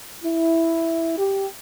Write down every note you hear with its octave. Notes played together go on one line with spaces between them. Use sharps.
E4
G4